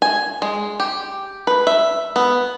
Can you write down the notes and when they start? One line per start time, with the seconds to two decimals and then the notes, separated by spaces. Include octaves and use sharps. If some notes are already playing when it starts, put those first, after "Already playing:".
0.02 G#5
0.42 G#3
0.80 G4
1.47 B4
1.67 E5
2.16 B3